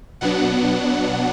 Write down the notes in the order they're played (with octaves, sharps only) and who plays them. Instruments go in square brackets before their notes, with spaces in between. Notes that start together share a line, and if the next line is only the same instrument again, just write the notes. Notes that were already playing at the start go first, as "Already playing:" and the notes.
[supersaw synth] B2 F#3 B3 D4 F#5